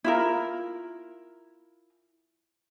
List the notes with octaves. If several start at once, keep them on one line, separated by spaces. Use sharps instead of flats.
E4 F4 A#4